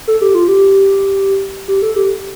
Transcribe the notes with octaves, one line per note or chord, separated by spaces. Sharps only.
A4
G4
F4
G4
G4
A4
G4